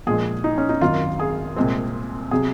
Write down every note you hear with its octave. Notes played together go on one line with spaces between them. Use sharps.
A#1 A#2 F3 G#3 G#4
D#4
C#4
D#4
G#1 F#2 D#3 F4
G#4
C2 A#2 G#3 C4
C3 F#3 C4 G#4